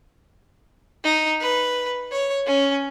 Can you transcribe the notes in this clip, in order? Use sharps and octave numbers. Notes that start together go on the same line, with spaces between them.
D#4
B4
C#5
C#4